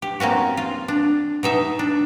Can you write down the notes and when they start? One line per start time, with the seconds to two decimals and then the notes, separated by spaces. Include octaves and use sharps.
0.02 G4
0.20 A#3 C4 C#4 F#4
0.57 F4
0.88 D4
1.43 B2 D#4 E5
1.79 D4